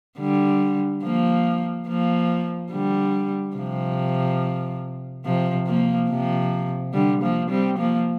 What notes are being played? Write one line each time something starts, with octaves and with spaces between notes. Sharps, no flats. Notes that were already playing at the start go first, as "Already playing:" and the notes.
D3 G3
F3 A#3
F3 A#3
D3 G3
C3 F3
C3 F3
F3 A#3
C3 F3
D3 G3
F3 A#3
G3 C4
F3 A#3